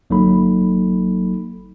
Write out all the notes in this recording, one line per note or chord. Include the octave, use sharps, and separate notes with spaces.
G1 F#3 A#3 D#4 A4 B5